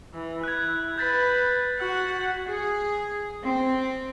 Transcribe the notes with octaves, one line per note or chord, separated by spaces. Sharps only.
E3
E4 F#6 G#6
B4 G6 A6 B6
G#6
F#4 F#5
G#4
C4